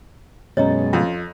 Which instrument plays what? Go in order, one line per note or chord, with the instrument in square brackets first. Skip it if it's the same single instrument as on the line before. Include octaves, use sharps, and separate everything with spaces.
[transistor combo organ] F#2 B2 G#3 [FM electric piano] C#4 A6 [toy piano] C#5 D#5 A#5
[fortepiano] F2